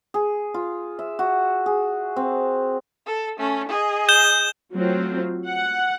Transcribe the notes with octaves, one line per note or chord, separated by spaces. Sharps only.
G#4
F4
E5
F#4
G#4
C4
A4
A3 C#4
G#4 D#5
G6 E7 G7
F#3 A3 C4 F4
F#5